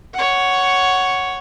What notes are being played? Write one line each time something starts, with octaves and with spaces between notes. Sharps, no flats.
C#5 F#5